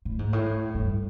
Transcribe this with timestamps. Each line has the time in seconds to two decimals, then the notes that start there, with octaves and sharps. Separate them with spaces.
0.05 A2
0.19 G#2
0.33 A2
0.75 G2